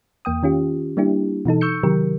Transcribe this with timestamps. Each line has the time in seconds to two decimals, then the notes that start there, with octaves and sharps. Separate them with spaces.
0.25 E2 A#3 G5 D#6
0.43 D#3 C#4 F4 G4
0.97 G3 A#3 D4 E4 G4
1.45 B2 E3 D#4 A4
1.61 C#6 E6 G6 C#7
1.83 C3 D#3 F#3 G4 A#4